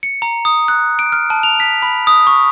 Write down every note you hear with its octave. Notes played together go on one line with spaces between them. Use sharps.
C#7
A#5
D#6
F#6
D7
F6
A5
F7
B6
B5
D#6
C#6